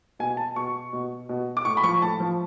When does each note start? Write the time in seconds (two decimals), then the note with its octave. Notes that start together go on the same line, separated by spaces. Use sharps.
0.19 B2 G#5
0.37 A5
0.56 B2 C#6
0.93 B2
1.29 B2
1.57 D6
1.65 A2 C#6
1.77 B5
1.83 F3 C#6
2.01 A2 A5
2.20 F3